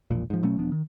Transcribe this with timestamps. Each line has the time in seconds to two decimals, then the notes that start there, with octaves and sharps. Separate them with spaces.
0.11 E1 A#1 A#2
0.30 G#2 F3
0.43 B2 F#3 A3 C#4
0.58 E1 F3 B3 D4
0.72 D#3